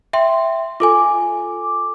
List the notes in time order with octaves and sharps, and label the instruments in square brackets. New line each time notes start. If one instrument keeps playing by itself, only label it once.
[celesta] E5 G5 C6
[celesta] F4 A4 G#5 [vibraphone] D6